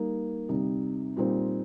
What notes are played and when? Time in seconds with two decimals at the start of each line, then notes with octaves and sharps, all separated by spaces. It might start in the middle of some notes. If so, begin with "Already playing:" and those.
Already playing: G3 A#3 D#4
0.49 C3 G3 D#4
1.16 A#2 G3 C4 D#4 C5